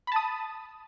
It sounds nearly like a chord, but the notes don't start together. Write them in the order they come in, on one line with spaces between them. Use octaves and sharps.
B5 A5 D#6